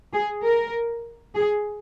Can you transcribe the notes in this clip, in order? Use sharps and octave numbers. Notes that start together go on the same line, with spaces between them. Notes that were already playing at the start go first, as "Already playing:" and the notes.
G#4
A#4
G#4